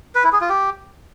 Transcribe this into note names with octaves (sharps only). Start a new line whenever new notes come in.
B4
E4
G#4
F4
G4